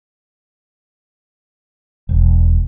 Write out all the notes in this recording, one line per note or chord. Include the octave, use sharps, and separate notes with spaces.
E1